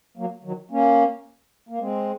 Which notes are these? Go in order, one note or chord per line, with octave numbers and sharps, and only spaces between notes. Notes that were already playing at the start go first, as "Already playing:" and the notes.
F#3 A#3
D#3 F#3
A#3 C#4
A#3
G#3 C4